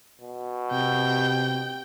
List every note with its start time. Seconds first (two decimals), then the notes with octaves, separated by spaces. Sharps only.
0.21 B2
0.72 C3 G5